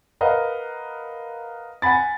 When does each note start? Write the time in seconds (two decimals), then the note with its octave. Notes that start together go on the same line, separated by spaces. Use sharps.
0.21 A#4 B4 D#5 F5 F#5
1.82 F#5 G#5 B5 A6